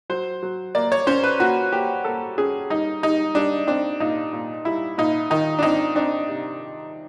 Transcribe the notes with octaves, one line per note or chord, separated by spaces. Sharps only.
F#3 C5
F#3
A#3 D5
C#5
C#4 C5
B4
A#3 F#4
A#3 G4
A#3 A4
C#4 G#4
G3 D#4
G3 D#4
G3 D4
C4 D4
A#2 D#4
A#2
G3 E4
A#2 D#4
D#3 D#4
D4
C4 D#4
C4 D4
C3